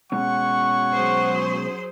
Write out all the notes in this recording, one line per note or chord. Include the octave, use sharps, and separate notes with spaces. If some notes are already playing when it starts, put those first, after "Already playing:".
B2 G#3 C#4 C#5 F#5 C#6
F#3 G#4 C5